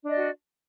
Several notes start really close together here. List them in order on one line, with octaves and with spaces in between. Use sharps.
D4 D#5 D5 F#4